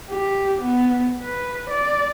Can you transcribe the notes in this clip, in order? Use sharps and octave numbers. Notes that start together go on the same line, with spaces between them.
G4
B3
B4
D5